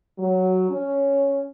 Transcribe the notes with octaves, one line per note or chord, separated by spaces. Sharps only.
F#3
C#4